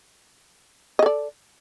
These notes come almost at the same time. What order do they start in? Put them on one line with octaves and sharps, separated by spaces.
D#5 A4 D5